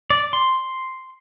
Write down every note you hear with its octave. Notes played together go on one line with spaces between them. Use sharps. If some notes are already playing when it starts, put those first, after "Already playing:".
D5
C6